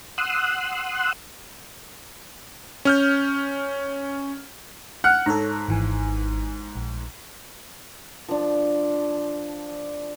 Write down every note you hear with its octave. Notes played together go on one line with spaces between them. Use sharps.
F#5 C6 D#6 E6 F#6
C#4 F6 G6
F#5 F6 F#6
G#2 A4 C#5 A#5
G#1 E3 G#5
A#1
F3 D4